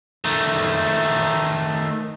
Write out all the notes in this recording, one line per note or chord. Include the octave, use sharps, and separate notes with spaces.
D#3 A3